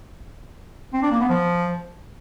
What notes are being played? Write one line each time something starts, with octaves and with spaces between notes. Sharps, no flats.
C4
D4
A#3
B3
F3